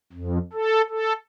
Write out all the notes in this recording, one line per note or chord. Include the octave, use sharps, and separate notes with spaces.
F2
A4
A4